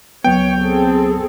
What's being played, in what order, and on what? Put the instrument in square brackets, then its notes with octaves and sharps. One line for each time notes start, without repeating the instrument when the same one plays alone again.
[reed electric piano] C#2 F#3 B3 [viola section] C#5 [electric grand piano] G5
[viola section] C4 G#4 A4